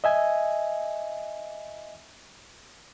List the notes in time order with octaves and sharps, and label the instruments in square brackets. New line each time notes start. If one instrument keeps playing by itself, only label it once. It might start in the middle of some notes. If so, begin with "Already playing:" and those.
[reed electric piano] D#5 E5 G#5